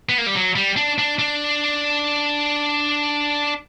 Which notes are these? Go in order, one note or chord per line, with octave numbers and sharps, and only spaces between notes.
B3
A#3
G3
F#3
G3
D4
D4
D4